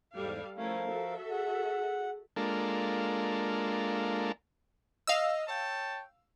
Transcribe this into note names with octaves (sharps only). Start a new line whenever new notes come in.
E2 G#2 G3 A4 F5
F3 A3 C#4 E4 A#4 F5
F#4 A4 E5
G#4 F#5
G#3 A#3 D4 F4 A4 A#4
D#5 F5 E6
C#5 G5 A5